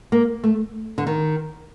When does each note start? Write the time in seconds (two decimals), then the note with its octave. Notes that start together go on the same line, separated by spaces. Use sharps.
0.12 A#3
0.44 A3
0.98 D3
1.07 D#3